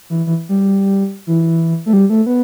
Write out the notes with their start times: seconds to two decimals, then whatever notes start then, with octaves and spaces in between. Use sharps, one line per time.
0.10 E3
0.27 E3
0.49 G3
1.27 E3
1.86 A3
1.93 G3
2.10 A3
2.26 B3